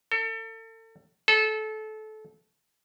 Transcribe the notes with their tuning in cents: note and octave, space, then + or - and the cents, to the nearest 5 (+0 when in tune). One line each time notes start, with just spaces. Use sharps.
A4 +35
A4 -25